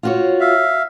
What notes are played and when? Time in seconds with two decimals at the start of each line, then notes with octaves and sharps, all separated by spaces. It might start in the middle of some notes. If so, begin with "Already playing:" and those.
0.03 F4 F#4 C#5
0.40 E5 F5